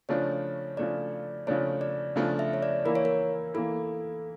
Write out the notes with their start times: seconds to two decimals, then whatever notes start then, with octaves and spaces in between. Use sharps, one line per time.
0.09 C#3 F3 A3 D4 C#5
0.77 C#3 F3 A3 D4 D5
1.47 C#3 F3 A3 D4 C#5
1.81 D5
2.16 C#3 F3 A3 D4
2.39 E5
2.54 C#5
2.62 D5
2.85 E3 A#3 E4 A#4
2.95 C#5
3.05 A#4
3.54 E3 A#3 E4 A4